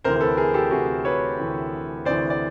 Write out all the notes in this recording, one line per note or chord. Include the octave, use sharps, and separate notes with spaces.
D2 C3 E3 A#4 C5
A#4
A4 B4
G#4 A#4
G4 A4
D2 C3 E3 F#4 G#4
B4 C#5
D2 C3 E3
D2 C3 E3 C5 D5
D5